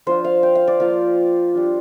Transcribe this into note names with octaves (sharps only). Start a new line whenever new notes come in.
F3 D4 F4 C5
F5
G5
F5
D5
F3 A#3 F4 F5
G3 D4 F4